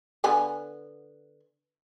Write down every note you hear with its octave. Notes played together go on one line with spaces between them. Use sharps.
D3 B3 G#5